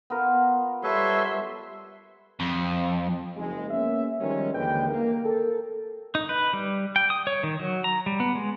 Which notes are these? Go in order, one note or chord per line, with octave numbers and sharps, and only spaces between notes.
B3 F4 A#4
G3 A4 B4 C#5 E5 C6
F2
F#1 G#3
A#3 B3 C#4 E5
D#3 F3 G3 G#3 C#4
D#2 D3 E3 G#3 B4 G5
A#3
A4 A#4
D#4
B4
G3
G5
D#6
C#5
D#3
F#3
A#5
G3
B3
G#3